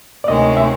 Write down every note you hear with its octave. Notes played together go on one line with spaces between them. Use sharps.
D5
D2 C3 D#3 G#3 C#4 D#5
E5